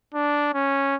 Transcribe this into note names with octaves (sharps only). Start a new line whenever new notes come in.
D4
C#4